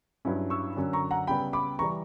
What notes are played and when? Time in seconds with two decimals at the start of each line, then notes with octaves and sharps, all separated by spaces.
0.25 G2 F#3 C#4 E4
0.50 C#6 E6
0.76 F#2 D3 F#3 C#4
0.93 A#5 C#6
1.11 F#5 A#5
1.27 C#3 G3 B3 G5 B5
1.53 B5 D6
1.79 E3 G3 A#5 C#6